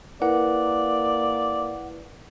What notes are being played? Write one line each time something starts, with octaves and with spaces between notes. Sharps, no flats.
A#3 E4 A#4 B4 D5 F#5